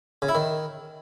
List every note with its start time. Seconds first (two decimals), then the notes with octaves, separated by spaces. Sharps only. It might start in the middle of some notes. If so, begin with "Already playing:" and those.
0.22 C#3
0.29 E4
0.35 D#3